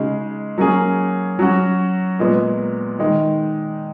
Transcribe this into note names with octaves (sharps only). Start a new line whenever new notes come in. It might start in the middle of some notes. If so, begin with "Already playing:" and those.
Already playing: C#3 G#3 D#4 F#4
F#3 A#3 C#4 G#4
F#3 C#4 F#4
A#2 G#3 B3
D#3 G#3 D#4